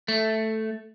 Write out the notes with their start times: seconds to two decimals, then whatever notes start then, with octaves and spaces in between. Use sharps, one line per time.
0.08 A3